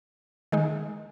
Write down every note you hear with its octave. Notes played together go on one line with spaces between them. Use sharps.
D#3 G#3 D#4